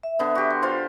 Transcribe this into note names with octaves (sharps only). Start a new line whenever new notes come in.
E5
D3 B3
F#4 G4
C6
F4 C5 F5